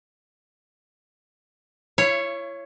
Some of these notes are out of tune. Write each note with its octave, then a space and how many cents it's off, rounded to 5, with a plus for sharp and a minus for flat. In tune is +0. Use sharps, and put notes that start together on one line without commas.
E4 +40 C#5 +0 F5 -45